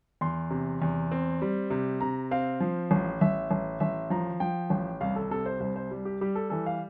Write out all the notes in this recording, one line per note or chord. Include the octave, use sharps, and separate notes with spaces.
E2 C6
C3
E2
C4
G3
C3
C3 A#5
C4 F5
F3
A1
A1 E5
A1
A1 E5
F3 A#5
F3 G5
A1
C2 F5
A4
C3 A4
C5
C2 C5
C5
G3
G4
G3 G4
A4
E3 A4
F5